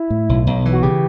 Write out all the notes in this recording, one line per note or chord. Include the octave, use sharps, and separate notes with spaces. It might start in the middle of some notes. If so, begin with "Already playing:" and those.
Already playing: E4
A2
B1
B1
E3
F#4
C#3 G4